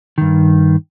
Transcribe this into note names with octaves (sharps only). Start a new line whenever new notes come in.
G2 D#3